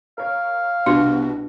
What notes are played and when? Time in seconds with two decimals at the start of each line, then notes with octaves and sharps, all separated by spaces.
0.18 A#4 C#5 F5
0.86 C2 B2 D4 F#4